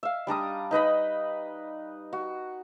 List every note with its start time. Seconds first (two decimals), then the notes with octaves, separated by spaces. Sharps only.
0.03 E5 F5
0.27 G3 D4 A#5 D#6
0.71 D#4 B4 D#5 B5
2.13 F#4